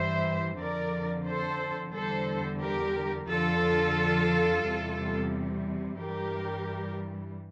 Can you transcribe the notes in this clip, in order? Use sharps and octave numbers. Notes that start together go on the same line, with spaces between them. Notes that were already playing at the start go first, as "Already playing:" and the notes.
Already playing: G2 E3 G3 C5 E5
F2 D3 F3 A#4 D5
A4 C5
E2 D3 G3 A4 C5
G4 A#4
F2 D3 F3 F4 A4
E2 C3 G3
G2 E3 G3 G4 A#4